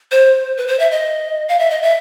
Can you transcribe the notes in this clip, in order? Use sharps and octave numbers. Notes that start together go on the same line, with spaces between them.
C5
B4
C5
E5
D#5
F5
E5
D#5
E5